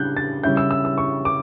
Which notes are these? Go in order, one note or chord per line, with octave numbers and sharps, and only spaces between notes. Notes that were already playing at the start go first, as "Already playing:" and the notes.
Already playing: C#3 G3 D4 F#6 G6
A6
C#3 G3 C#4 E4 G6
E6
E6
E6
C#6
D6